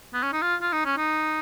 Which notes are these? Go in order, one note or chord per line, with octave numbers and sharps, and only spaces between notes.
B3
C#4
D#4
F4
F4
D#4
C#4
D#4